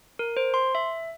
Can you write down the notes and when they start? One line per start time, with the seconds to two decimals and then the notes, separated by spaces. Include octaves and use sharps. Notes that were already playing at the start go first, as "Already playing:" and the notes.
0.19 A#4
0.37 C5
0.54 C6
0.75 E5